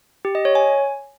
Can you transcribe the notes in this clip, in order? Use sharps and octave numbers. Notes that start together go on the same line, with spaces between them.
G4
D#5
C#5
G#5